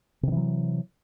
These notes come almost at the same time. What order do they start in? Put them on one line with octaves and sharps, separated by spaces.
C3 D#3 E3 F#3